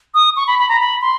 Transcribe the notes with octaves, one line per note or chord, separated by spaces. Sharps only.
D#6
C#6
B5
B5
A#5
B5
C6